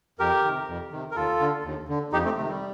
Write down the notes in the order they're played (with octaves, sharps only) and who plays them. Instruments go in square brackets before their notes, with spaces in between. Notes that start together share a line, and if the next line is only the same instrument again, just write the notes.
[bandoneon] F2 G4 A#4
C3 D#3
F2
C3 D#3
A#4
D#2 F4 A4
D3
D#2
D3
F2 D#4 G4
A3 C4
C3 D#3 A3
G3